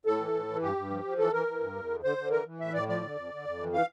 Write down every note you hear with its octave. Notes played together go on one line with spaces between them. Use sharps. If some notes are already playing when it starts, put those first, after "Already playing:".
A2 A4
E3
A2
E3
G2 G4
G2
F3
F3
E3 A4
E3 A#4
E3
G2
E2
D3
D3 C5
D3
E3 A#4
E3
A2 E5
A2 D5
F3 D5
D3
F2
D3
F2
E3
E3 F5